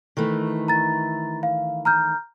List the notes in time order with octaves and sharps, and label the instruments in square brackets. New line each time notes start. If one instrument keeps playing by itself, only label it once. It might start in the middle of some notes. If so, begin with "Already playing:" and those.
[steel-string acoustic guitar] D#3 E3 A3
[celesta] A#5 A6
F5
A#5 F6 G6